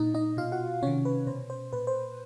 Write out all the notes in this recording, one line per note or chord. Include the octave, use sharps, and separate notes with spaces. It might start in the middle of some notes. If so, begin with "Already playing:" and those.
Already playing: A#2 D#4 D#5
D#4 D#5
B2 F4 F5
F#4 F#5
C3 D#3 C#4 C#5
B4
B2 C5
C5
A#2 B4
C5